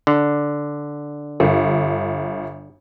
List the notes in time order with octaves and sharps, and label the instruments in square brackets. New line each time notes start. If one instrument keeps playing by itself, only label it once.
[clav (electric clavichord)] D3
[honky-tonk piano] G1